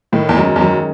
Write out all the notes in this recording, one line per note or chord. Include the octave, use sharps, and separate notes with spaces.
A2 D#3
E2
F#2 G#3 C#4
E2
F#2 D#3